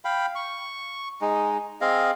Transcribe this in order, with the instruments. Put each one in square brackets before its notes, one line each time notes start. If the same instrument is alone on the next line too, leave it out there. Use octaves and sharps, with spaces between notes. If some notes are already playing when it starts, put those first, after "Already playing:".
[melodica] F5 G5 B5
C#6
G#3 D#4
C4 G#4 D#5 F5